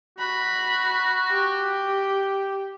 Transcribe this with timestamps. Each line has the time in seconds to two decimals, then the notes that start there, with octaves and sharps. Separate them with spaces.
0.19 F#4 B5
1.32 G4